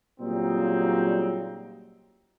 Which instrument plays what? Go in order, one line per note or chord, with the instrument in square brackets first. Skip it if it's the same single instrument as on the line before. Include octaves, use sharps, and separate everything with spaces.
[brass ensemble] A#2 C#3 F#3 G3 C4 D#4